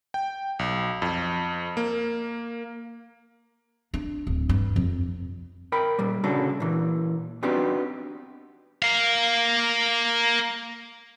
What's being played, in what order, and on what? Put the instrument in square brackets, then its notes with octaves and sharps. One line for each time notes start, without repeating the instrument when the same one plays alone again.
[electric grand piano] G5
B1
F2
A#3
[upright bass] D4
D1
G2
F2
[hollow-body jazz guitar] A#4 G5 B5
A#2 G3
C2 C#3 D4 F#4 A4
A#2 E3
B3 C4 D4 D#4 F#4 G4
[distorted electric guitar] A#3 F5